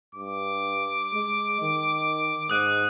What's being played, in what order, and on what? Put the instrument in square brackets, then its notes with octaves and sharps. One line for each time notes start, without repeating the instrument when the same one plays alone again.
[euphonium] G2 [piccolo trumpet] D6
[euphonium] G#3
D#3
[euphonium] G#2 [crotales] D#6 F#6 D#7